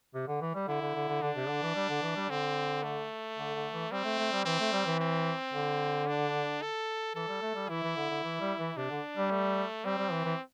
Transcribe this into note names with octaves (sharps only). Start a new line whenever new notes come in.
C3
D3
E3
G3
D3 E4
D3
D3
D3
D3 D4
C3
D3
E3
G3
D3
E3
G3
D3 C4
A3
D3
D3
E3
G3 C4
A3
A3
G3
E3 C4
A3
G3
E3
C4
D3
D4
A4
E3 A4
G3
A3
G3
E3 E4
E3
D3
D3
E3
G3
E3
C3 D4
D3
G3
A3
G3 C4
G3
E3
E3